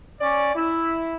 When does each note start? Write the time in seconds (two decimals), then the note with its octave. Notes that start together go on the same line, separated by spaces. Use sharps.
0.19 C#4 D5
0.55 E4